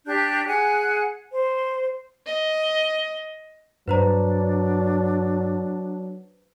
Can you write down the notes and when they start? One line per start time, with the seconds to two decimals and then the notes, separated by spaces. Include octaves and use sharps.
0.06 D4 G4 F#6 G6
0.46 G#4 F#5 G#5 F#6
1.32 C5
2.26 D#5
3.88 G2 F#3 D4 B4 C5 A#5